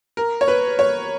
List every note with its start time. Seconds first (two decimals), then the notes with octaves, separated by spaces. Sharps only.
0.17 A#4
0.41 C#5
0.48 B4
0.79 C#5